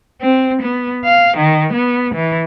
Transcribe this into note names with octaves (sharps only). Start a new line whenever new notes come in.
C4
B3
F5
D#3
B3
E3